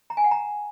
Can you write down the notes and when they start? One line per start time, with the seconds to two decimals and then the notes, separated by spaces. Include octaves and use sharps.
0.10 A#5
0.17 G#5
0.24 F#5
0.31 A#5